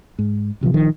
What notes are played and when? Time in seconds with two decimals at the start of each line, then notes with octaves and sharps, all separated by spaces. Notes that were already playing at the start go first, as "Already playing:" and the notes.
0.19 G#2
0.61 A1 C3 E3 F3
0.74 A#1 D#3 F3